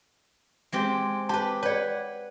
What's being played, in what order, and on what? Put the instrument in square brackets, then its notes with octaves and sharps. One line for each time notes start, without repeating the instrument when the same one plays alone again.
[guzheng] G#3 C4 G4
[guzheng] G4 B4 [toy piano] A5
[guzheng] B4 F#5 [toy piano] C#5 D5